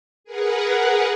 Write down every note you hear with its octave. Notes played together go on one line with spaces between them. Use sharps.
G#4 A#4 B4 F#5